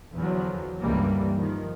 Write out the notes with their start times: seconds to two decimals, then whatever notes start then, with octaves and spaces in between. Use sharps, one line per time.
0.14 E2 D3 F3 F#3
0.81 C#2 G2 D3 E3 G3 A#3
1.37 D#3 F3